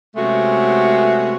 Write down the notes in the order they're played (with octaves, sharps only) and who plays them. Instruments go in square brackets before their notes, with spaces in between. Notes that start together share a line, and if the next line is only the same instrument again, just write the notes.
[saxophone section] C3 G#3 A3 B3 C#4 F#4